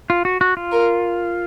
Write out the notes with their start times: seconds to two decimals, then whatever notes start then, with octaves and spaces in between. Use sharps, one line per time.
0.10 F4
0.25 F#4
0.41 F#4
0.57 F4
0.72 A#4